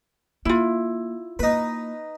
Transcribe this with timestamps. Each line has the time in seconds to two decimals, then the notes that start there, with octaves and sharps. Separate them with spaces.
0.45 A#3 E4 F4
1.39 A#3 D#4 B4